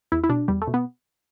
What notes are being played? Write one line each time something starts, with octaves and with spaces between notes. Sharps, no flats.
E2 E4
E4
B2 D4
E2 G3
A3
B2
B3